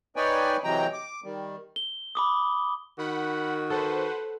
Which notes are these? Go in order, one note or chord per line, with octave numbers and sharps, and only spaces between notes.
D#4 B4 C#5 D5 G5 G#5
C3 E3 F#3 G#3 G5 A#5
D6
D#3 G3
G7
B5 D6 D#6
D#3 F#4 F#5 B5
A4 B4 C5 F#5